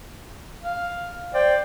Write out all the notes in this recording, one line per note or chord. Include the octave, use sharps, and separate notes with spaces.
F5
C5 D5 G5